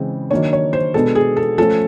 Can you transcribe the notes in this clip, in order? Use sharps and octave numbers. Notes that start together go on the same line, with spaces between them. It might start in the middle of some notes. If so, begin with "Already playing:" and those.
Already playing: C#3 E3 G#3 C4
D#3 F#3 A#3 D4 C#5
C#5
C5
B2 G#3 B3 D4 A4
G#4
A4
F3 A3 C#4 A4